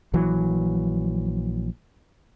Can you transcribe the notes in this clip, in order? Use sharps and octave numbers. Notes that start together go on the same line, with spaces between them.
A#1 E3 F#3